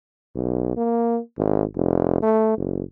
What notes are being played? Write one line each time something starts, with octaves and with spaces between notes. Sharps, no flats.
B1
A#3
G#1
F1
A3
F#1